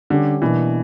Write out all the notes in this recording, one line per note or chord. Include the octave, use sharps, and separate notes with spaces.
D3 G3 C#4 G4
B2 E3 A#3 D4